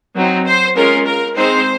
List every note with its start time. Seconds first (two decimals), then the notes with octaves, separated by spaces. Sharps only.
0.15 F#3 C4 D#4
0.45 C5
0.76 G#3 C#4 F4 A#4
1.06 A#4
1.36 G#3 C4 D#4 C5